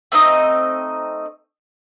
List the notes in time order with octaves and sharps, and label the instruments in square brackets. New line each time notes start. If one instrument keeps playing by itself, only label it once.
[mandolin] A3 C4 D#4 D#5